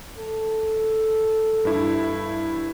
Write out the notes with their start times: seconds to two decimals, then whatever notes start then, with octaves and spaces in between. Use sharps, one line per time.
0.18 A4
1.65 G2 E4